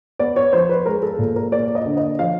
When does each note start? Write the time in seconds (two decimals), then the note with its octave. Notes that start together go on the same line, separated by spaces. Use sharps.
0.19 B3 D5
0.36 C#5
0.53 F3 C5
0.69 B4
0.86 G#3 A#4
1.03 A4
1.19 A#2
1.36 A#4
1.52 A#3 D5
1.75 D#5
1.86 D3
1.97 D#5
2.19 F3 F5